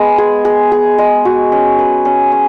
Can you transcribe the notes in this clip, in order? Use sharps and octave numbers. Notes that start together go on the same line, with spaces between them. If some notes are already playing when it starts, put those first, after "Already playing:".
Already playing: G#3 B3
G#4
G#4
G#4
G#3
F#4
C#4
B4
C#4
C#4